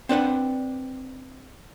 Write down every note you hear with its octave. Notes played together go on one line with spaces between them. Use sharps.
C4 D4 B4 F#5